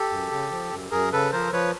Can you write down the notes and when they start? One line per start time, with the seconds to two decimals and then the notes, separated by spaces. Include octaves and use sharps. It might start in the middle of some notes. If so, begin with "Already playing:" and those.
Already playing: G4 A4
0.10 F#2
0.31 C#3
0.51 F3
0.71 F#2
0.91 F#2 G#4 A#4
1.13 C#3 A4 B4
1.32 F3 A#4 C5
1.53 F3 B4 C#5